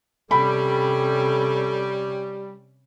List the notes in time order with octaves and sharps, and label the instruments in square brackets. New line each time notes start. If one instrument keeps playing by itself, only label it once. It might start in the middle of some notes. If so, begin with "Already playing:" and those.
[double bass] C3 C#4 [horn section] G3 [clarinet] A4 [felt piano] B5